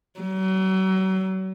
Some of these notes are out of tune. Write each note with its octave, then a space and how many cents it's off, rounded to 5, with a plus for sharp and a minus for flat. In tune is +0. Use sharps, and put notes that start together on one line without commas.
F#3 +40